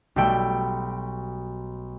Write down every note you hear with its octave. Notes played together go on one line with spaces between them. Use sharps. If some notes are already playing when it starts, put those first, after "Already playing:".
B1 G3 A3 G5 B5 E6